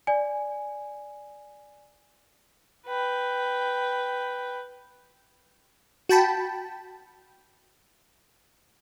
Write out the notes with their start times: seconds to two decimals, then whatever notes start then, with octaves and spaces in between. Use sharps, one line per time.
0.07 D5 G#5
2.86 B4 G5
6.09 F#4 G5 A5 B5